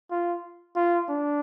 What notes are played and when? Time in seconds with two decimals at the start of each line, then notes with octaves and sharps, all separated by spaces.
0.11 F4
0.76 F4
1.09 D4